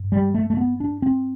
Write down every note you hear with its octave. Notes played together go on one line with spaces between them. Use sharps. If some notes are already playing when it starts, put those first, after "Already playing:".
Already playing: G2
G3
A3
A3
B3
D4
C4